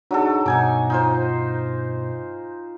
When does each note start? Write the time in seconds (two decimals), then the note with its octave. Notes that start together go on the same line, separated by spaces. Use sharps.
0.11 F#3 D4 D#4 F#4 G#4 A4
0.46 G2 B2 D#4 G#5 D6
0.90 D#4 F4 C5